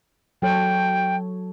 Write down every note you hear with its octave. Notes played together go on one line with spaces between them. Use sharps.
F#3 A4 C#5 G5